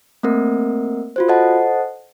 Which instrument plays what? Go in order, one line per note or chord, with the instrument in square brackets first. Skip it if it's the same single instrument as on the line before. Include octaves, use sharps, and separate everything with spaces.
[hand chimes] A3 A#3 C4 A#4
F4 F#4 C5
A4 C5 D#5 F#5 A5